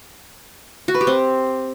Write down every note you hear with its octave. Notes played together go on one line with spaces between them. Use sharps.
F#4
B4
G4
C4